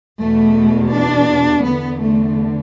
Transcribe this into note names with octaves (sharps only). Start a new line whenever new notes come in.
E2 B2 A3
D4
E2 D3 B3
A3